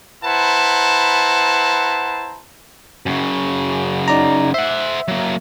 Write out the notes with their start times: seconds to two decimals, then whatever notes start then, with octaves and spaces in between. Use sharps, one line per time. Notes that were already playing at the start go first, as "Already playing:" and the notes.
0.24 E4 B4 C5 F#5 A5 A#5
3.06 F#2 C#3
4.08 D#4 D5 A#5
4.54 C5 E5 F#5
5.08 F#3 A#3